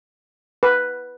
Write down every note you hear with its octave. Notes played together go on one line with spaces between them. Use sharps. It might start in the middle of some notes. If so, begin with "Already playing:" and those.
B4